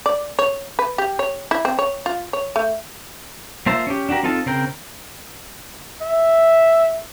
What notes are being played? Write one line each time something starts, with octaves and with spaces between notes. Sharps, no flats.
D5
C#5
B4
G4
C#5
E4
C4
C#5
F4
C#5
A3
A#3 F4 C5 E5 A5
C#4 G4
D4 F#4 G4 A#4
C4 D#4 F4 A4 A5
C#3 C4 A#4 G5
E5